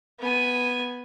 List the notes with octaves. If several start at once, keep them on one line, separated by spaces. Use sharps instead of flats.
B3 G#5